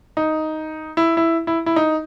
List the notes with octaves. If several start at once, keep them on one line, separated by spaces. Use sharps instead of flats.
D#4
E4
E4
E4
E4
D#4